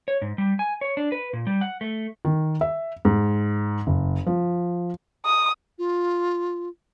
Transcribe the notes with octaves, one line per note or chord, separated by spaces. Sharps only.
C#5
G#2
G3
G#5
C#5
D4
B4
A#2
G3
F#5
A3
D#3
E5
G#2
F#1
F3
D#6
F4